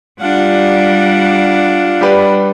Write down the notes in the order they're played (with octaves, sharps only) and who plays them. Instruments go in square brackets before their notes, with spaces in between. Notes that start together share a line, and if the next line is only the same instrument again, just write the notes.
[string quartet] G3 [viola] D4 F#5 [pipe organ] F4 F5
[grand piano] G3 G4 B4